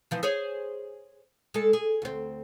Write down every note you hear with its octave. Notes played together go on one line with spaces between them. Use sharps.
E3 F3 C4
G#4 C5 C#5
G#3 A4
G#4
D2 C4